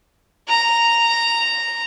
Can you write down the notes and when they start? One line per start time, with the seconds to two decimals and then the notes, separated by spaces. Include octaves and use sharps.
0.48 A#5